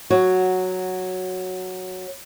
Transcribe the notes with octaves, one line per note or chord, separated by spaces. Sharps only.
F#3 F#4